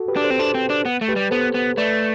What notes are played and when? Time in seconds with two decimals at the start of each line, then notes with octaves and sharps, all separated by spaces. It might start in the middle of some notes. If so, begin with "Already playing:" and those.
Already playing: F#4 A4
0.08 G4 B4
0.16 D4
0.24 A4 C5
0.30 C4
0.39 D4 A4 C5
0.54 C4
0.70 D4
0.85 B3
1.01 A3
1.08 G4 B4
1.16 G3
1.31 B3 A4 C5
1.54 B3
1.77 A3 B4 D5